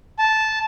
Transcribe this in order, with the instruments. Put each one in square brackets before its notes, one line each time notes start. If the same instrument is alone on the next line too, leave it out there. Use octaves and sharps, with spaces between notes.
[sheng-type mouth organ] A5